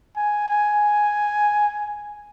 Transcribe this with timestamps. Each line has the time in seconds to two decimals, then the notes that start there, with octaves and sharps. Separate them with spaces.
0.16 G#5
0.48 G#5